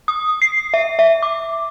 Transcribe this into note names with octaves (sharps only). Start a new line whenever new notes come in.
D#6
C7
E5
E5
D6